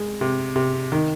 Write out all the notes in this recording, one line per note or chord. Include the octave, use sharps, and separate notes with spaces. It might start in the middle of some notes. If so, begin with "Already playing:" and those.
Already playing: G#3
C3
C3
D#3